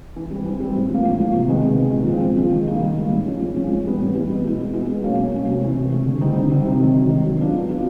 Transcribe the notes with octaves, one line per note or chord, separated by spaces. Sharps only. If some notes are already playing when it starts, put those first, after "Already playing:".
E3
G3 C4
E3
G3 C4
A2
F3 A#3
A2
F3 A#3
C3
D#3 G#3 B3
C3
D#3 G#3 B3
A#2
F3 G#3 C4
A#2
F3 G#3 C4
D#3
G3 A#3 D#4
D#3
G3 A#3 D#4
A2
F3 G#3 C#4
A2
F3 G#3 C#4
A2
E3 G3 B3
A2
E3 G3 B3
B2
G#3 B3 E4
B2
G#3 B3 E4
B2
F#3 A#3 C#4
B2
F#3 A#3 C#4
C3
E3 A3
C3
E3 A3
D3
G3 C4 D#4
D3
G3 C4 D#4
C3
D#3 F#3
C3
D#3 F#3
F#3
B3 D4 F4
F#3
B3 D4 F4